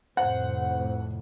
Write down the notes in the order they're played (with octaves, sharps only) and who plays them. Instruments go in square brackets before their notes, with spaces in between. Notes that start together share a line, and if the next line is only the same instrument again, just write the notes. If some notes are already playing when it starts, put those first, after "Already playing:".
[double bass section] F2 A2 C3 [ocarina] C5 [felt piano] F#5